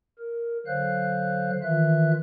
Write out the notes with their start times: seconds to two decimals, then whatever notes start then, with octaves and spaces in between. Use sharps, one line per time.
0.18 A#4
0.66 D3 F#3 C5 F5 F#6
1.63 D#3 E3 F4 E5 F#6